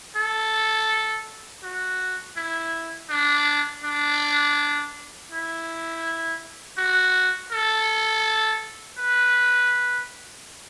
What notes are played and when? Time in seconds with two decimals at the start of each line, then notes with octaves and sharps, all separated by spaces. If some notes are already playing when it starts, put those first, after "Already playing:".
0.16 A4
1.63 F#4
2.37 E4
3.10 D4
3.84 D4
5.31 E4
6.78 F#4
7.52 A4
8.99 B4